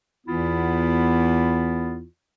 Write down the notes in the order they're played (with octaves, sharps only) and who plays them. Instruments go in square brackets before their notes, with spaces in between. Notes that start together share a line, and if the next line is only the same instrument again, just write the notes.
[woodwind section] E2 E3 B3 E4 F4